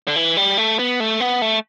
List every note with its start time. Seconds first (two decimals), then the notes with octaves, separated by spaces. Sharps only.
0.08 D3
0.16 E3
0.37 G3
0.58 A3
0.79 B3
1.00 A3
1.20 B3
1.42 A3